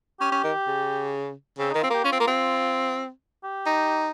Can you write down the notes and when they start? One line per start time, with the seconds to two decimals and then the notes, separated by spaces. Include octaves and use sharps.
0.20 C#4 G4
0.32 C#4
0.44 D#3
0.67 C#3
1.59 C#3 C4
1.71 D#4
1.74 D#3
1.82 C4 F4
1.90 A#3 G4
2.04 C#4 F4
2.12 C4
2.20 A#3
2.27 C4
3.44 G4
3.66 D#4